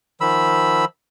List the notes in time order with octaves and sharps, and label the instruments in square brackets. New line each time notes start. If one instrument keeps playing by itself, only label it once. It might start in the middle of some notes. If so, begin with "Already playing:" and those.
[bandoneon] D#3 F3 B5 E6